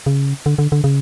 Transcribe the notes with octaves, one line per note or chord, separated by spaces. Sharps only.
C#3
D3
D3
D3
C#3